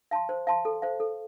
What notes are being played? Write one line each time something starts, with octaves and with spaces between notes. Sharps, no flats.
F5 A5 C6
C5
F5 A5 C6
A4
C5 F5
A4